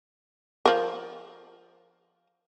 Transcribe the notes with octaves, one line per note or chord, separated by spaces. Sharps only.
F3 A#4